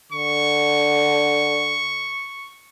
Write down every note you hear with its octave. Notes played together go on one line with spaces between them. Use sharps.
D3 C#6